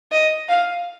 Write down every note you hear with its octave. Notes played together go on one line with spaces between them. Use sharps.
D#5
F5